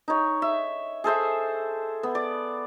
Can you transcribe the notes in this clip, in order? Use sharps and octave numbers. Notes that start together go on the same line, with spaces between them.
D#4 C#5
E5
G#4 A4 C5 E5
B3
D5